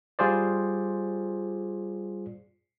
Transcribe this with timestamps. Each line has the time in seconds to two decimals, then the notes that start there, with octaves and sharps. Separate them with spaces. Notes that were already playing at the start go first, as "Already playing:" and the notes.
0.19 G3 F4 G#4 C5 D5